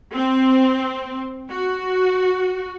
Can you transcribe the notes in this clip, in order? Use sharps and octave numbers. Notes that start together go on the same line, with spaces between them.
C4
F#4